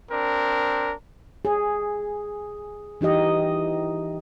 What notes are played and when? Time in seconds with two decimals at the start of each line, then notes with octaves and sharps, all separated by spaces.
0.11 C4 D4 A#4
1.45 G#4
3.01 E3 D#4 G4 D#5